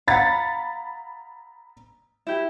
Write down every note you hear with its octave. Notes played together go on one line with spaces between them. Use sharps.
F5 F#5 A#5 B5 A6
E4 G4